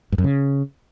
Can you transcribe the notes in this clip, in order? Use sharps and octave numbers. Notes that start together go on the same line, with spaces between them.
G2
F#2
C#3